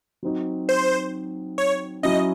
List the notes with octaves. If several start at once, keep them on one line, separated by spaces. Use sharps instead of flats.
F#3 C4 D#4 F#4
C5
C#5
F#3 C#4 E4 D#5